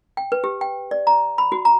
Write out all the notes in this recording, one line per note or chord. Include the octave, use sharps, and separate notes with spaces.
G5
B4
G4
G5
D5
A#5
B5
F#4
A#5